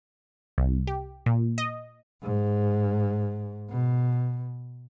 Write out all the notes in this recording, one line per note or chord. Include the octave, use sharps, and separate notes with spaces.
C2
G4
A#2
D#5
G#2
B2